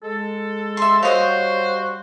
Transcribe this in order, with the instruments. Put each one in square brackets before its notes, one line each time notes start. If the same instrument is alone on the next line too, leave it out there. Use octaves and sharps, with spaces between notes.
[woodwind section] G#3 A4
[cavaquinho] E5 C6
[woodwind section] G3 F#4 [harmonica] C5 [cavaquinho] C#5 D#5 F#5 [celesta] F5